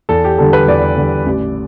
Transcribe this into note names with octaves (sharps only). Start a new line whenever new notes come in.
E2 A4
G4
D3 G3 A4
B4
E2 D5
D3 G3
A1